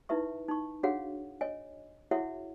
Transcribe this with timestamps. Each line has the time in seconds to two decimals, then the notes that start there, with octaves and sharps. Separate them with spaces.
0.09 D#4 E4 B4 E5 C#6
0.48 D#4 C#6
0.83 D4 F#4 G#4 C#5 F5 F#5
1.41 C#5 D#5 G#5
2.11 E4 F#4 G#4 C#5 E5 F#5